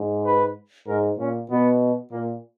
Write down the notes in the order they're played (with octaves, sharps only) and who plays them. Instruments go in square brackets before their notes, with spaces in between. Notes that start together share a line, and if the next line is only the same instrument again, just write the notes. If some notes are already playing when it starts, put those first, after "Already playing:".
Already playing: [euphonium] G#2
[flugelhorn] B4
[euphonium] G#2 [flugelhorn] A#4
[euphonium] A#2 [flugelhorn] C#4
[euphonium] B2 [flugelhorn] B3
[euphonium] A#2 [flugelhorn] A#3